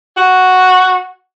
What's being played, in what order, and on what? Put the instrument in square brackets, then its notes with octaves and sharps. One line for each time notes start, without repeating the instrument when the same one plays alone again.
[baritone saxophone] F#4